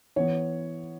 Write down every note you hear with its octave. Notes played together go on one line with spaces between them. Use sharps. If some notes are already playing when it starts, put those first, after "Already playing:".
E3 B3 C#5